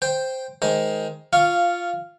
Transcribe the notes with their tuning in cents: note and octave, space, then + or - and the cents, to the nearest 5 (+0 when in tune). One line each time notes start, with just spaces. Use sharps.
C5 +0 G5 +0
D#3 +15 G#3 +15 C5 +0
F4 +0 F5 -10 C#6 +5